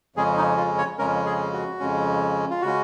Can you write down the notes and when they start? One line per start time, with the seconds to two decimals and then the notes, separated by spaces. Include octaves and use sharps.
0.16 F2 C#3 G#3 C#4 G#4
0.37 D#4
0.57 F4
0.78 C#5
0.98 F2 C#3 G#3 C#4 A#4
1.26 G#4
1.53 F#4
1.80 F2 C#3 G#3 C#4
2.50 F4
2.62 C#3 G#3 C#4 F#4